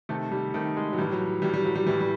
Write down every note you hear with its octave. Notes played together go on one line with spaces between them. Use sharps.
C3 D#3 A3
G3
C3 D#3 A3
G#3
F#3
A2 E3 G3
F#3
A2 E3 G3
G3
F#3
G3
A2 E3 G3
G3